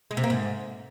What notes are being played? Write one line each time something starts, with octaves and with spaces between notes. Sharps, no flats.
G#3
C3
A#3
G#2